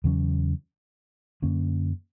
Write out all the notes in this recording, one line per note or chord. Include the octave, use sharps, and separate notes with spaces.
E2 C#3 F#3 C#4
F#2 D3 A#3 C#4